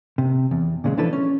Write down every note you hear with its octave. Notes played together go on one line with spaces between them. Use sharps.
C3
E2
A#2 C#3 G#3
E3 F3 D4 E4 A4 B4
C#4